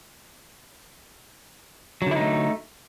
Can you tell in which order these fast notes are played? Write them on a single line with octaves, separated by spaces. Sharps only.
F#3 D3 E4 D#4 A3